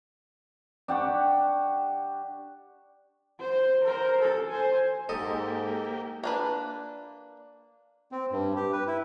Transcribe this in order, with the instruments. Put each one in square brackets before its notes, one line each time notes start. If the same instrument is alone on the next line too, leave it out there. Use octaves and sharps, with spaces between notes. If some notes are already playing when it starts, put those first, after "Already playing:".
[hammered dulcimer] D4 G4 F#5 C#6
[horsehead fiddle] C5
A#4 C5
A4
C5 G#5
[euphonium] G#2 [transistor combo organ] A#3 G4 [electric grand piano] A4 [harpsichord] D#5
[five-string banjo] A#3 D4 B4
[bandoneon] C4
G2
G4
B4
E4